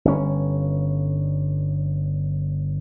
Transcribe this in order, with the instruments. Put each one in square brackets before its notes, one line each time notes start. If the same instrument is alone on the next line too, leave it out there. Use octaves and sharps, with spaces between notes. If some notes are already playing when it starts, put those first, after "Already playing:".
[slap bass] G1 C#4